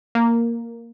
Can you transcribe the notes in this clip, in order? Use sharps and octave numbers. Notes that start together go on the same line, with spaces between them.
A#3